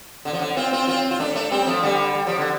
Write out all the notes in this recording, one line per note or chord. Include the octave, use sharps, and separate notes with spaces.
D3
F3
D3
C4 F4
C4 F4
C4 F4
F4
A3 D4
A3 D4
G3 C4
F3 A3
D3 G3
G3
F3
D3